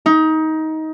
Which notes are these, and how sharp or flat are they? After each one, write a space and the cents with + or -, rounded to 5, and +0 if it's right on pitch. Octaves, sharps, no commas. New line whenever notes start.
D#4 +20